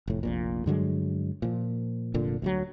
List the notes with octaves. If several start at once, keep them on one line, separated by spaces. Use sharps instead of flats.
F1 A2
F1 A#1 A#2
G2 D3 F#3 G#3
A#2 F3
F1 A#2 D3
D2 C#3 F#3